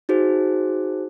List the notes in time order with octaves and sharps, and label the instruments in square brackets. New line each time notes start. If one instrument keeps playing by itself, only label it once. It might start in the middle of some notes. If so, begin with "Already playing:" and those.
[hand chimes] D#4 F#4 G#4 C5